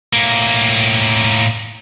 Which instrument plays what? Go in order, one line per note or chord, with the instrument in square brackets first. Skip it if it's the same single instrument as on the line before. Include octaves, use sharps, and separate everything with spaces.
[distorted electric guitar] A2 A#3